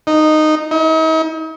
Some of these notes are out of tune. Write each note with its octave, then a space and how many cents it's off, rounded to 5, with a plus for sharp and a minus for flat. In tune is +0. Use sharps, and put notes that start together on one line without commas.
D#4 -10
D#4 +45